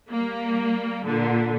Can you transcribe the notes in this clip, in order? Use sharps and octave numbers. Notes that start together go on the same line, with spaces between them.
G3 A#3
A#2 D3